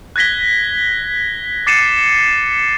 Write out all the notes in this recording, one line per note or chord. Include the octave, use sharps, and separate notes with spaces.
F#6 G#6 A#6 B6 G7
D6 A6 C7 C#7 D#7 E7